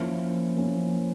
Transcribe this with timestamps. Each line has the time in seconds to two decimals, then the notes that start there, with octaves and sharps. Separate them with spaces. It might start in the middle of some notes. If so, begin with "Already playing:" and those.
Already playing: F3 A#3 C#4 E4 C5
0.55 F3 A#3 C#4 E4